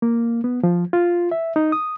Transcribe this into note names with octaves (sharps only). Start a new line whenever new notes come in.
A#3
B3
F3
F4
E5
D#4
D#6